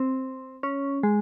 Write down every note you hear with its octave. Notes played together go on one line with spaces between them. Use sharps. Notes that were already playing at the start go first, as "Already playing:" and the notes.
Already playing: C4
C#4
G#3